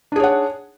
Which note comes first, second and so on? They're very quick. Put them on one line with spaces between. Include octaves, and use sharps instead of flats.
D4 G#4 C#5 F#5